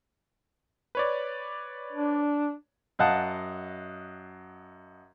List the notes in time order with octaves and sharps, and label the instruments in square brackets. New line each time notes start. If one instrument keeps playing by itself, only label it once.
[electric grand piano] B4 C#5 D5
[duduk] D4
[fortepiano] F#2 D#5 F5 F#5 A5